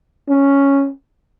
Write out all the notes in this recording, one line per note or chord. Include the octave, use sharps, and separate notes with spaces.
C#4